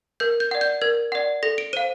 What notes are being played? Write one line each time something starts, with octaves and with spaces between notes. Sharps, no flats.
A#4 G6
G6
D5 F#5
G6
A#4 G#6
D5 F#5
A4 A#6
D7
C5 F5 D#7